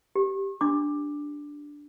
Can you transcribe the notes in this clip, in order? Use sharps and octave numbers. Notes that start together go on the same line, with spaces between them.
G4
D4 D6